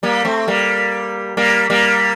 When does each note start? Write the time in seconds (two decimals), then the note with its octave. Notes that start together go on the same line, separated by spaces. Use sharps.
0.03 G3 A#3
0.25 A3 C4
0.48 G3 A#3
1.37 G3 A#3
1.70 G3 A#3